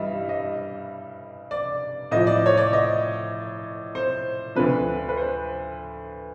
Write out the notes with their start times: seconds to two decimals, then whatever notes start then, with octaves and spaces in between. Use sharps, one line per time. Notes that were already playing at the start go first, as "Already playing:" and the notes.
Already playing: G2 E3 G3 D#5 E5
0.29 D#5
1.51 D5
2.11 A2 F3 D#5
2.27 D5
2.46 C#5
2.57 D5
2.73 D#5
3.95 C5
4.55 D2 D3 F3 B4
5.09 B4
5.17 C5